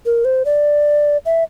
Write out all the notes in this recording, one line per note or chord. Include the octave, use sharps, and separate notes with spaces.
A#4
C5
D5
E5